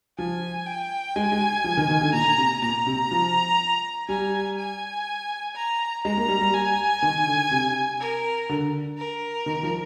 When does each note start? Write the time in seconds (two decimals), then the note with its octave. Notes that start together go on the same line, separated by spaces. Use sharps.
0.18 F3 G#5
0.66 G5
1.16 G#3 G#5
1.32 G#3
1.64 F3
1.77 D#3
1.90 D#3
2.01 D3
2.13 A#2 A#5
2.38 C3
2.62 A#2 A#5
2.86 C3
3.11 F3
4.08 G3 G#5
4.58 G#5
5.55 A#5
6.04 G#3 A#5
6.17 A#3
6.28 G3
6.41 G3
6.54 G#5
7.02 D#3
7.27 D3
7.51 C3
8.00 A#4
8.49 D3
8.97 A#4
9.46 D#3
9.63 F3